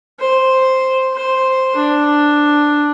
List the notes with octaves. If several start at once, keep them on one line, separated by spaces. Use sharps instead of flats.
C5
C5
D4